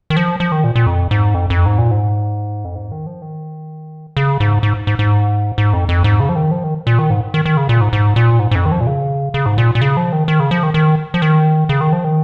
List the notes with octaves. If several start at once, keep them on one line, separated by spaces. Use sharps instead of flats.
D#3
F3
F3
D#3
A#2
A#2
F2
G#2
F2
F2
G#2
A#2
G#2
F2
G#2
D#3
F3
D#3
C#3
G#2
G#2
G#2
G#2
G#2
F2
F2
G#2
C#3
F3
D#3
F3
D#3
A#2
D#3
G#2
D#3
D#3
C#3
A#2
G#2
G#2
A#2
G#2
G#2
F2
D#3
F3
A#2
C#3
C#3
G#2
A#2
A#2
C#3
F3
D#3
D#3
C#3
F3
D#3
D#3
F3
D#3
C#3
D#3
F3
D#3